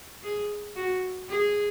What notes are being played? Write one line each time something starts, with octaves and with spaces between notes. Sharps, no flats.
G#4
F#4
G#4